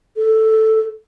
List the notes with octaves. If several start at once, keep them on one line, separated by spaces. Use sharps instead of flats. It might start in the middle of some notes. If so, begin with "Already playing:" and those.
A4